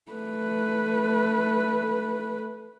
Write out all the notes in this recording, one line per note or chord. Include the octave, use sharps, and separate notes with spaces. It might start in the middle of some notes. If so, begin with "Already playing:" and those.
A3 B4